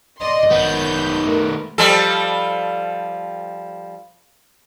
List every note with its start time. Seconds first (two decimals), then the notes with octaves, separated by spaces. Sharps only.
0.20 D5 D#5 C6
0.52 G#1 D#3 B3 G6
1.23 A3 A#4
1.78 F3 G3 A4